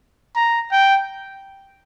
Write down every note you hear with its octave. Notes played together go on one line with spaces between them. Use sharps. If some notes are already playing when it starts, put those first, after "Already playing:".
A#5
G5